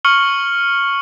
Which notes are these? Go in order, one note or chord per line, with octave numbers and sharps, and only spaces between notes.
C#6 F6 C#7 F#7 G7